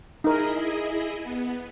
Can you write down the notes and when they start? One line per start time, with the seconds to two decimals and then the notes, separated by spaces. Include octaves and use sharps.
0.24 D#4 E4 G#4 A#4 D#5
1.22 B3